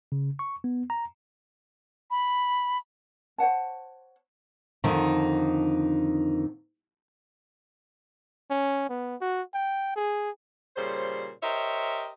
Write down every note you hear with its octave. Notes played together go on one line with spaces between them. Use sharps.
C#3
C#6
B3
A#5
B5
C5 C#5 F#5 A5
F2 D3 D#3 D#4
C#4
B3
F#4
G5
G#4
A#2 C#3 G3 C5
G4 A#4 C5 C#5 D#5 E5